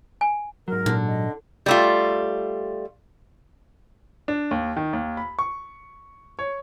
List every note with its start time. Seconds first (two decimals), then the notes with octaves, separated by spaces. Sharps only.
0.21 G#5
0.68 G#2 F#3 A#4
0.86 A#2 D3
1.07 D#5
1.66 G3 A3 F4
4.28 D4
4.51 D#2
4.77 D#3
4.93 D#2
5.17 B5
5.39 C#6
6.39 C#5